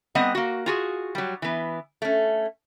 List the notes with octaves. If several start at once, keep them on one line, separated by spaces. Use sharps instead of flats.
G3 B3 C4 D#5 F#5
A#3 F#4
F4 F#4 G#4
F#3 G3
E3 B3
A3 C#4